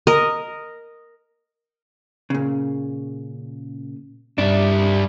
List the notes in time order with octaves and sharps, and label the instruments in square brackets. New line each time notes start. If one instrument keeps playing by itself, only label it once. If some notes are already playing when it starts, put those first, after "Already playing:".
[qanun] A#4 D#5
[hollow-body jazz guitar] A#2 C#3
[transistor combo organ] G2 [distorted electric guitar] G3 E5 [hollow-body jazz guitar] D4